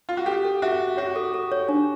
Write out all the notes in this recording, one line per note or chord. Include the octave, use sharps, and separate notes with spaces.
F4
F#4
G4 A4
A4
F#4 E5
E5
F#4 C#5
A4
A4
C#5
D4